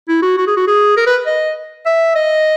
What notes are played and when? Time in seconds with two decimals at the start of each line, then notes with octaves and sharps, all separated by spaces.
0.08 E4
0.22 F#4
0.37 F#4
0.47 G#4
0.57 F#4
0.67 G#4
0.97 A#4
1.07 B4
1.27 D#5
1.86 E5
2.15 D#5